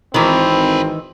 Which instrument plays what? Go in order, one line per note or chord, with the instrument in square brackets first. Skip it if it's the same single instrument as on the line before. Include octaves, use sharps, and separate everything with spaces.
[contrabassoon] G#1 [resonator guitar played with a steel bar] D#3 E3 [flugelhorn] C4 [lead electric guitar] A4 B4